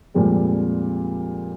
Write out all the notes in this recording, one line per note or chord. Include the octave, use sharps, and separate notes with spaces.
F2 A#2 F3 G3 G#3 C4